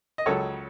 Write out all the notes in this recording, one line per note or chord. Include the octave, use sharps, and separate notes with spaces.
D#5
C#2 C#3 F#3 A4 C#5